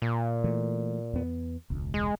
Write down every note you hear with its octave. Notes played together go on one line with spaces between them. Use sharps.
A#2
E3 A3
E2 B3
E1 C#2
G#3